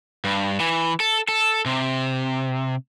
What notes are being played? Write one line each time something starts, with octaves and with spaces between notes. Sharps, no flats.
G2
E3
A4
A4
C3